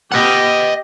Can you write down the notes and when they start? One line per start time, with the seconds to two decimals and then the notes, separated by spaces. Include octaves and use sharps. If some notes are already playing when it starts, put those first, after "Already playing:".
0.12 G4 D#5 F#5